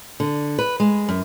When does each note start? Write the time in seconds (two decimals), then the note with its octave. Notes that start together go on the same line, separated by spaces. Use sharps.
0.20 D3
0.59 B4
0.80 G#3
1.09 F#2